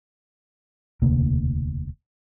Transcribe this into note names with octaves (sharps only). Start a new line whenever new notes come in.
E1 D2 C3 A#3